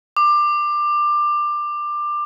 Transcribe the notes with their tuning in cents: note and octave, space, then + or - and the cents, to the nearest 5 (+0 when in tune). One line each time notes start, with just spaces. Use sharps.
D6 +20